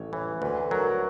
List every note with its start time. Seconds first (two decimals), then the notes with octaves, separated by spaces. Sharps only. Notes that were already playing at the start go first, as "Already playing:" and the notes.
Already playing: A1 C#5
0.13 E3 C#5
0.42 D2 B4
0.71 F#3 A#4